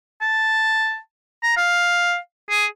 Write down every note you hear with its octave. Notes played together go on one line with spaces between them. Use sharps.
A5
A#5
F5
G#4